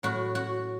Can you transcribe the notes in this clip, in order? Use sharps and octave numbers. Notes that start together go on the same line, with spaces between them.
A2 F#3 F#4
F#4